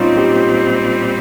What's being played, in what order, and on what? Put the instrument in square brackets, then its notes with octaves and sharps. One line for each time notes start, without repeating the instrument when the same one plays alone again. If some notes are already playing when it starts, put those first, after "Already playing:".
Already playing: [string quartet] A#2 G3 C4 [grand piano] C#4 D#4 F4
[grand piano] G4